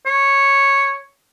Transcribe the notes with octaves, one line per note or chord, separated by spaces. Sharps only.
C#5